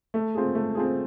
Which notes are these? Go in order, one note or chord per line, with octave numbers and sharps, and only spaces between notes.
A3
C4 F4 G#4
A3
C4 F4 G#4